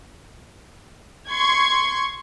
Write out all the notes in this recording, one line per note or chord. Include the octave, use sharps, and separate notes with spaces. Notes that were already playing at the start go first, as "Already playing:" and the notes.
C6 C#6 G#6